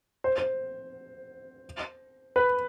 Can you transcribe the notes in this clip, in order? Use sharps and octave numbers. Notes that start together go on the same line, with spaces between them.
C5
C5
B4